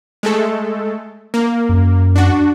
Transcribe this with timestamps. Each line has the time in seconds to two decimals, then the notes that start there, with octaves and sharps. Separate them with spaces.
0.23 G#3 A3 A4
1.34 A#3
1.69 F#2
2.16 D4 F#4